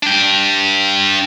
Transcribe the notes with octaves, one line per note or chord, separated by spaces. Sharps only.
D4 G5